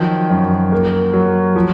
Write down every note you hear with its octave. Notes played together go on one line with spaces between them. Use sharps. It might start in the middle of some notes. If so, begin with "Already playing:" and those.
Already playing: D#3 F3 F#3
F#2
A#3
F#3
F3